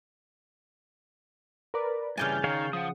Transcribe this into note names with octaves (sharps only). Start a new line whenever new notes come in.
A#4 B4 D5
G2 C#3 E3 D5 G#5 F6 G6 A6
D#3 G#4 C#5 F5
F3 F#5 D#6